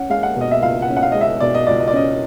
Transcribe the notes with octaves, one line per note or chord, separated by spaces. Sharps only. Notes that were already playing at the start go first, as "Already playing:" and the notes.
Already playing: C#4 F#5
G#3 F5
F#5
B2 D#5
E5
C#2 F5
F#5
C#4
F#5
F5
G#3 D#5
E5
B2 D5
D#5
C#2 D5
D#5
D5
C#4 D#5